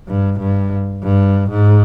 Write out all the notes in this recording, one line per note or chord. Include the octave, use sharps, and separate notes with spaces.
G2
G2
G2
G#2